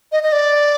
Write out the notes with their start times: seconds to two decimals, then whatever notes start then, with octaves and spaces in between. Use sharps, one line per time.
0.12 D#5
0.23 D#5
0.32 D5